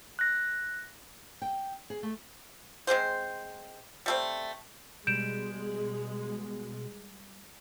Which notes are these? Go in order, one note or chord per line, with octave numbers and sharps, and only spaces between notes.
F#6 A#6
G5
G#4
A3
G#3 C4 G#4 C5
G3 A3 C4
B2 G3 G#3 G6 D7 E7